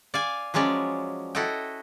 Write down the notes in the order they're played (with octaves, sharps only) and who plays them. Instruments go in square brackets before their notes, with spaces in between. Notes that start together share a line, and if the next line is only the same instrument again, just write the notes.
[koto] D5 F5 G#5
F3 F#3 G#3 C#4 D5
E4 F#4 A4 D#5 G5